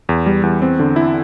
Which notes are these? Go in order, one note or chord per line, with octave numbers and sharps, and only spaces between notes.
E2
G3
E2
C4
D3
E4